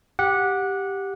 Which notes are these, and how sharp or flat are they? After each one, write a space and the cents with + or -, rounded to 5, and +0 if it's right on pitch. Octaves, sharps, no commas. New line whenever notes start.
G4 +0 F#5 -15